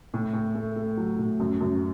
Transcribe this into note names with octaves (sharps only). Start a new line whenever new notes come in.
A2
A2
A3
A3
F#3
A2
F#2
F#2